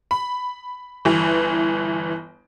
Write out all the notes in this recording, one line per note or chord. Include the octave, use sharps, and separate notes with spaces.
B5
G1 E3